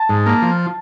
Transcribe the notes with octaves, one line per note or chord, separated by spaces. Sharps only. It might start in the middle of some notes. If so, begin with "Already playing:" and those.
Already playing: A5
G#2
A#3
F3